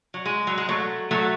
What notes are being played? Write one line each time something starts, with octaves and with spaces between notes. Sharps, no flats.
F#3
G#3
F#3
G#3
F#3 A3
F#3 A3